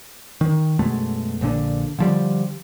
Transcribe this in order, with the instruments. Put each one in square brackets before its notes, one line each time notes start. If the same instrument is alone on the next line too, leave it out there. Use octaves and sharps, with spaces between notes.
[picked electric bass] D#3
F#2 B2 G#3 A3
A#1 A#2 D3
D3 F3 G3